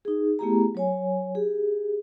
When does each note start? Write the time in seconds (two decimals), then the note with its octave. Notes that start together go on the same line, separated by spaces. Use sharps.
0.05 D#4 G#4
0.39 A3 B3 E4 G4 G#4 A#5
0.75 F#3 C#5 G#5
1.35 G4 G#4